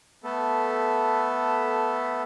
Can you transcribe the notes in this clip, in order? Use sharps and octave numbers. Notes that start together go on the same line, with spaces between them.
A3 B3 A4